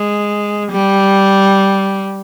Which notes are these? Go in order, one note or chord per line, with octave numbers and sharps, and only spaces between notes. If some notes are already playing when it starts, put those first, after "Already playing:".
Already playing: G#3
G3